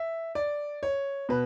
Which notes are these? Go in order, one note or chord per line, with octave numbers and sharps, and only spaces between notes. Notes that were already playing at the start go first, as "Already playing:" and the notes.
Already playing: E5
D5
C#5
B2 B4